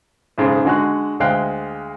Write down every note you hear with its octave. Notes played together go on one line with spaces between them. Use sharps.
B1 G#2 C#3
D3 G#3 F#4 C#6 F#6
D2 G#3 F5 G5 F#6